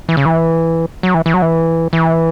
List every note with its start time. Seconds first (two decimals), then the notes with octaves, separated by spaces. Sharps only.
0.09 E3
0.17 C#3
0.26 E3
1.03 F#3
1.14 E3
1.26 E3
1.34 F#3
1.42 E3
1.93 E3